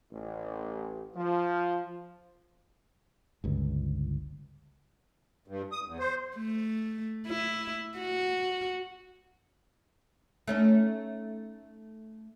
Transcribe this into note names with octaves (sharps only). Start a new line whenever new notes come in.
A1
F3
G1 C#2
G2
D#6
E2
C5
A3
E4
F#4
A3 C#4 D#4